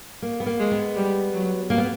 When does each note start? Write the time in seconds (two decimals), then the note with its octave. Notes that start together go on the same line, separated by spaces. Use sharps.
0.22 A#3
0.40 B3
0.46 A#3
0.59 G#3
0.71 B3
0.96 G3
1.33 F#3
1.70 A#3
1.78 B3